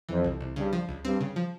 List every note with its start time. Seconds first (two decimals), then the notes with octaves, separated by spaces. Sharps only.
0.09 F2 E3
0.24 C2
0.41 C2
0.56 G2 C#3
0.73 F3
0.89 C#2
1.04 G2 C4
1.21 C#3
1.36 F3